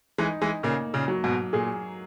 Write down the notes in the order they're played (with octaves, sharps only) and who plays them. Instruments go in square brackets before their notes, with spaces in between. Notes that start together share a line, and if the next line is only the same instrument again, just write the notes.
[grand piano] E3 G#3 [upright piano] D#4
[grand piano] E3 G#3
[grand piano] A#2 C#3 [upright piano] A#3
[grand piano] A#2 C#3
[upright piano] F#3
[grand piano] G#2 B2
[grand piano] A#2 [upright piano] G#4